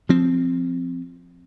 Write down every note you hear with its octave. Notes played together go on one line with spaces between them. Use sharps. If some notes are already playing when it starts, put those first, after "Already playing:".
F3 C4